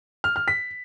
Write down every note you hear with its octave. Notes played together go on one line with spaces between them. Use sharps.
F6
F6
B6